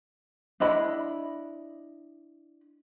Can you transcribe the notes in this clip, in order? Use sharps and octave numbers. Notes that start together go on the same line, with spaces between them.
D4 E4 D#5 B5